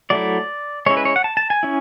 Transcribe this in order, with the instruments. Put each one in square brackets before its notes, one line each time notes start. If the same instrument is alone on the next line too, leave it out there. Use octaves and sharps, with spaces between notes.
[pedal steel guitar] F#3 A3 E4 D5
G#3 C#4 E4 C#5
B4
C#5
F#5
A5
A5
G#5
C#4 E4